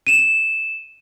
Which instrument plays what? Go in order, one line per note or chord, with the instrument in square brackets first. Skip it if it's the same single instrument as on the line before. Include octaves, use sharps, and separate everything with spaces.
[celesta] D#7 E7